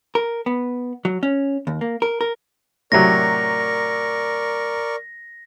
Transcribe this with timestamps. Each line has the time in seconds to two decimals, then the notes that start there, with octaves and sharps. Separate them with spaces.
0.15 A#4
0.46 B3
1.05 F#3
1.23 C#4
1.67 D#2
1.81 A#3
2.02 A#4
2.21 A#4
2.92 A2 C3 F#3 A#4 D5 C#6 A#6